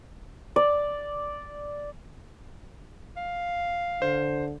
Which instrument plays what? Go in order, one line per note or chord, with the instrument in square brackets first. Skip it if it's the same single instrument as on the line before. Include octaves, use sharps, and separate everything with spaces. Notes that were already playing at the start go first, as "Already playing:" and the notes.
[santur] D5
[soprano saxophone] F5
[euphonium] D3 [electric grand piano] C5